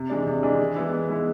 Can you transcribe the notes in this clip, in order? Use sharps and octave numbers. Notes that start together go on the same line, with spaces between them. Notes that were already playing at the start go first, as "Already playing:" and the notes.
Already playing: C3
E3 G#3 D4
C3
E3 G#3 D4
E3
G#3 B3 E4
E3
G#3 B3 E4